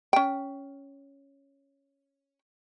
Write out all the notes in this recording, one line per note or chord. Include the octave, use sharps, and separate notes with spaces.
C#4 G5